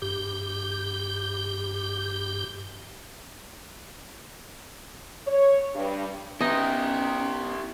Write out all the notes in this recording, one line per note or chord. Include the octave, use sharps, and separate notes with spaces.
G2 G4
C#5
G2
B3 C#4 D#4 E4 G4 D#5